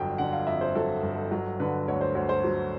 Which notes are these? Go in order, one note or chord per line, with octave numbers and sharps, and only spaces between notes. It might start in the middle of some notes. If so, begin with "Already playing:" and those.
Already playing: G1 F2 D3 F#3 G5
D3 F#5
F5
F2 E5
C5
F#3 A4
G1
F#3
D3 B4
D2 C#5
C5
D2 C5
C5
F#3